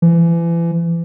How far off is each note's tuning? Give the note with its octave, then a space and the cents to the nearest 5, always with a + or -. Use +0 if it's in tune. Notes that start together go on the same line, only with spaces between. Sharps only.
E3 +35